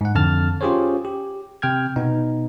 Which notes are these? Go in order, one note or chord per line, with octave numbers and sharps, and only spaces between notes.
G#2 F#5
F2 D3 A5 F6 A6
C#4 F4 G4 G#4 C5 C#5
G4
C3 G5 F6 G#6
B2 B3 D#4